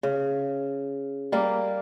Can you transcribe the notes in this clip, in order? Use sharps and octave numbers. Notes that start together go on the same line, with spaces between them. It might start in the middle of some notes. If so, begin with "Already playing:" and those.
C#3
G3 A#3 F5